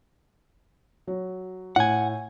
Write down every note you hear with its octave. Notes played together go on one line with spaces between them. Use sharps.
F#3
A2 F#5 G#5